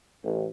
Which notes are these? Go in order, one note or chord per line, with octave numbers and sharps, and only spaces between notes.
A1